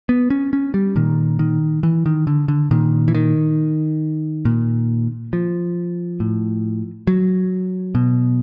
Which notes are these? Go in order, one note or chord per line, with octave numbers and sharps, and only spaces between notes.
B3
C#4
C#4
G3
A#2 D#3
D#3
E3
D#3
D3
D3
A#2 D#3
E3
D#3
A#2
F3
A2
F#3
B2